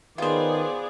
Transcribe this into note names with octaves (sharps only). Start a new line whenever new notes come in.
D#3 B3 F4 G#4 B4 C5 D5